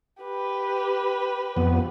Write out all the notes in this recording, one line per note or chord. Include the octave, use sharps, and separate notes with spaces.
G4 B4
F2 B3